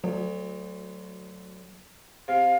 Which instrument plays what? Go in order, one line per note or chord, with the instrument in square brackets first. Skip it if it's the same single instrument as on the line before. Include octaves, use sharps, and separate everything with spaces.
[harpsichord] D2 [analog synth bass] F#3
[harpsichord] C3 [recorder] F5